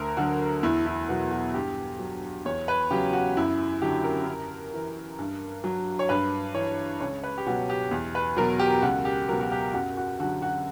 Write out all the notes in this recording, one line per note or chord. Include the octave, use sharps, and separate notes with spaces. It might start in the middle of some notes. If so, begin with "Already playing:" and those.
Already playing: D2 A#4
D3 F#3 F#4
E2 E4
E4
B2 F#3 F#4
F#4
G2 G4
F#3
E2 C#5
B4
C#3 F#3 G4
F#4
F#2 E4
D3 F#3 G4
A#4
F#2
E3
G2
F#3
C#5
G2 B4
E3 C#5
C#2 C#5
B4
G4
B2 F#3 F#4
G4
E2
B4
B2 F#3 A#4
G4
C#2 F#4
G4
B2 F#3 A#4
F#4
G4
F#2 F#4
F#4
D3 F#3 F#4
F#4